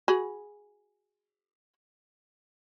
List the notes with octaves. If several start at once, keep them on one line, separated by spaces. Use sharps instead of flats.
F#4 G#4 B5